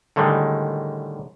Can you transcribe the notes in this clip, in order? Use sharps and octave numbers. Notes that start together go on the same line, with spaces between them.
A2 D3 D#3 G3 G#3